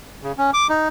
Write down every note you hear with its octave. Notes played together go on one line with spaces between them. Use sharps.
C#3
C#4
D6
D#4